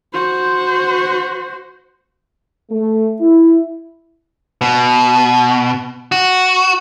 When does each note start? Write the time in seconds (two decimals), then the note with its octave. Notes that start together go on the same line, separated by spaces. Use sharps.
0.13 F#4 C5
2.70 A3
3.21 E4
4.61 B2
6.12 F#4